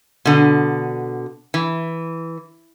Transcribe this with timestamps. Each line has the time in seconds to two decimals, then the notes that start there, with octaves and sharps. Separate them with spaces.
0.25 B2 D3
1.54 E3